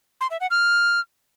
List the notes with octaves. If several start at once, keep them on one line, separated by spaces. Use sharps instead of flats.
C6
E5
F#5
F6